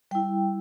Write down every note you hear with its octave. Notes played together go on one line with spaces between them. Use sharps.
G3 E4 G5